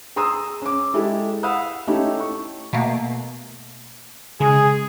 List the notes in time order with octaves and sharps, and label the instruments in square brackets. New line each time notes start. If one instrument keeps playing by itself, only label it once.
[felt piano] G#4 A#5 C6 D#6 E6
C#4 D6
G#3 E4 G4 A4
F5 F#5 B5 D#6 E6
A3 C#4 D#4 E4 G4
C#6
[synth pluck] B2 A3 A#3
[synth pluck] C#3 G#3 [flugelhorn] G#4